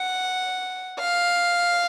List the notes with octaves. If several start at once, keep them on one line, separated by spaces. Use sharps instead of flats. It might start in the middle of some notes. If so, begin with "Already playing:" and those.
Already playing: F#5
F5